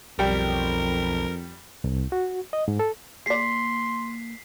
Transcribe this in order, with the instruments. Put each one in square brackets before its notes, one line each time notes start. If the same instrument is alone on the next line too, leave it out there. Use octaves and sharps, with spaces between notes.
[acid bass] B1 [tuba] F2 [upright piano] G3 G5 [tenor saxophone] A#4
[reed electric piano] C2
F#4
D#5
G#2
A4
[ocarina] A#3 [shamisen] G#4 D5 [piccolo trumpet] C6 [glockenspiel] B6 C7